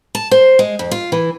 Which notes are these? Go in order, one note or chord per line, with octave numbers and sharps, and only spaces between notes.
A5
C5
G#3
F2
F4
E3